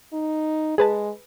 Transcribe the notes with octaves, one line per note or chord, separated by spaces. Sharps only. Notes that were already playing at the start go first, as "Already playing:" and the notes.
D#4
G#3 G#4 B4 A5